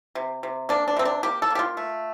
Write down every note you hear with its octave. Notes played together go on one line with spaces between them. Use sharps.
C3
C3
A#3 D4
D4
C3 C4
D4
A#3 G4
A4
A#3 G4
F4
A3